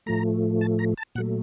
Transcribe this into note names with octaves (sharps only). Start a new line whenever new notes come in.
A2 F3 A3 A#5
A5
A#5
A5
A#2 F#3 A3 F#5